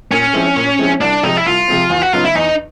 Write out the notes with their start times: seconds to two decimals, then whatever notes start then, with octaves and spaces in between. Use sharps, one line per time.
0.11 A#2 C#4
0.33 F3 G#3 C4 E4
0.56 A#2
0.79 F3 G#3 C4 E4
1.01 C2 D4
1.23 C3 F3 G#3 C4 D#4
1.37 E4
1.46 C2 F4
1.68 C3 F3 G#3 C4
1.90 E2
2.02 F#4
2.13 C#3 F#3 B3 D#4 F4
2.24 E4
2.35 E2 D#4